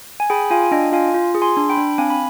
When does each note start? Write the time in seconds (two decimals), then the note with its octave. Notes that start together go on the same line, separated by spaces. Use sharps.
0.20 G#5
0.30 G#4 G5 B5
0.50 F4 F5 G#5
0.71 D4 D#5 G5
0.92 F4 F5 G#5
1.14 F4
1.35 G#4
1.42 G#5 C6
1.56 D4
1.70 G5 B5
1.77 D4
1.98 C4 F5 G#5
2.10 B5